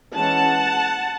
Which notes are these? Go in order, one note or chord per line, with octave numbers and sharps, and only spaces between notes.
E3 G#3 C#4 F#5 A5